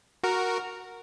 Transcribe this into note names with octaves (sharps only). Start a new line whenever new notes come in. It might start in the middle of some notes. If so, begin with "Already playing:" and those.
F#4 A#4